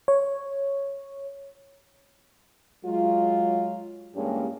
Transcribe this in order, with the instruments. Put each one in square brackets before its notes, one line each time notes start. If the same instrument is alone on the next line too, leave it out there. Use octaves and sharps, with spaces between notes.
[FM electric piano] C#5
[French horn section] F#3 G#3 F4
E2 G2 G#3 A#3 C#4 G4